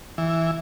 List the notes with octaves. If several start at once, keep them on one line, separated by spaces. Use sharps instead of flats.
E3